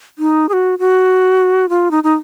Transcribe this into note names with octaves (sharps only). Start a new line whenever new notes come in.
D#4
G#4
F#4
F#4
F4
D#4
D#4